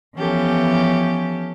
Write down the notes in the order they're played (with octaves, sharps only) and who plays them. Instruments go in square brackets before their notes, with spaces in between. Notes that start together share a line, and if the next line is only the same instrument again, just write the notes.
[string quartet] E3 F3 B3 C#4 G4 A4